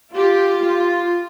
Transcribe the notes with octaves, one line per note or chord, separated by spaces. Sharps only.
F4 G4
F4